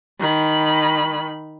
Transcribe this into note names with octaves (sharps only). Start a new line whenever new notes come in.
D#3 B5